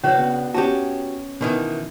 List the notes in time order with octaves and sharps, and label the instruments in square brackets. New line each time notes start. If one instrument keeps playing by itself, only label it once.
[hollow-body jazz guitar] C#3 [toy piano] C#4 B4 C#5 [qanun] D4 F#4 B5
[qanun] B3
[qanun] B3 C#4 [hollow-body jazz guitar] F#4 G4 [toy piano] A5
[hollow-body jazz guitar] B2 D#3 E3